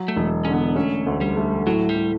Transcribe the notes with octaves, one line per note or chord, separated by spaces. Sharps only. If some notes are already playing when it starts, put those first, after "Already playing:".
Already playing: F#3
A3
E1
D3 C#4
B3
A3 C#4
D2
G3
A3
A2 F#3
G3
A2